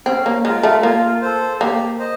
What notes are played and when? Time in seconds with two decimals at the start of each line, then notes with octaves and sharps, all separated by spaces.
0.06 C4 C#4
0.26 A#3
0.45 G#3 F4 A#4
0.63 A3
0.83 A#3 F4
1.22 A4 C5
1.60 A#3 G4
1.99 C5 D#5